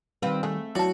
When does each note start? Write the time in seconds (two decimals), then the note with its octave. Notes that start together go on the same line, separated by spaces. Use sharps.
0.22 D#3 G3 C4 F4 B4
0.43 G#3 A3 G#4
0.75 F#3 E4 F#4 C#5 D5 A5